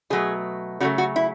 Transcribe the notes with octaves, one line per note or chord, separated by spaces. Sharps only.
B2 F#3 A3 G#4
C#3 F#3 A3 F#4
F#4
E4